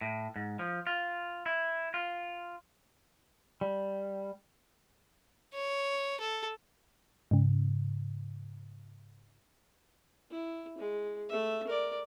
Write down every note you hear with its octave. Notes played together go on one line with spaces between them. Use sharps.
A2
G#2
F3
F4
E4
F4
G3
C#5
A4
G#2 C#3
E4
G#3
A3 E5
A#4 D5